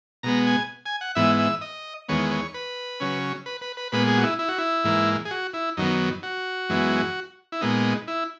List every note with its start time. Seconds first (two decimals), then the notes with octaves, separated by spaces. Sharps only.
0.23 B2 G#3 B3 A#5
0.47 G#5
0.86 G#5
1.01 F#5
1.15 G#2 E3 B3 E5
1.39 E5
1.61 D#5
2.09 E2 D#3 G#3 B3 C#5
2.31 C#5
2.54 B4
3.00 C#3 F#3 C#4
3.46 B4
3.61 B4
3.77 B4
3.92 A#2 G#3 B3 B4
4.07 G#4
4.18 F#4
4.23 E4
4.39 E4
4.48 F#4
4.58 E4
4.84 G#2 E3 A#3
5.25 G#4
5.31 F#4
5.54 E4
5.77 F#2 D#3 F#3 B3 D#4
6.23 F#4
6.69 F#2 E3 G#3 B3
7.52 E4
7.61 A#2 G#3 B3 D#4
8.08 E4